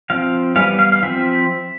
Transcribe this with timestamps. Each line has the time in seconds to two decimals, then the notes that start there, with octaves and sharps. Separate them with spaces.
0.10 F3 C4 F5
0.56 E3 G3 B3 F5
0.79 F5
0.92 F5
1.03 F3 C4 E5